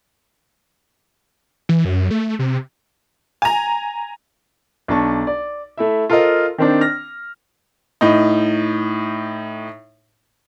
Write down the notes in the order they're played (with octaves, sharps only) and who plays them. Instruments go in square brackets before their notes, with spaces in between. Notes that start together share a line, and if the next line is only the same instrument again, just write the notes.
[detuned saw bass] E3
F#2
A3
C3
[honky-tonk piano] G#5 A#5
[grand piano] B1 D4 A5 C#6
D5
A3 E4 E5
F4 A4 A#4 C5 D#5 F5
D#3 C4 D4
F6 A#6
[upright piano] A2 D#4